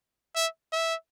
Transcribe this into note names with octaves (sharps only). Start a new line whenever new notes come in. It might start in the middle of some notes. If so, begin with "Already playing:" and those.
E5
E5